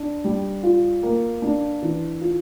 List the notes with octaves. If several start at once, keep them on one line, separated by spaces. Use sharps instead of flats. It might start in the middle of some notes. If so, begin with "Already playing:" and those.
Already playing: D4
G3
F4
A#3
D4
E3
F4